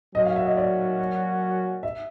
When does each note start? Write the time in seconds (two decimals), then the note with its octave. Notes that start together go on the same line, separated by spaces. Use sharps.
0.15 F#3 A#3 C#4 F#4 D#5
0.25 F5
0.36 E5
0.46 D#5
0.57 D5
1.83 E5